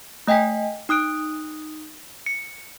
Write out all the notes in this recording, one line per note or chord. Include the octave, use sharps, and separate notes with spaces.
A3 D#5 G5 G#5 B6
D#4 D#6 F#6 D7
C#7